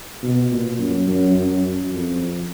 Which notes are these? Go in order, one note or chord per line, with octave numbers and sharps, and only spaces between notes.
B2
A#2
F#2
F#2
F#2
F#2
F2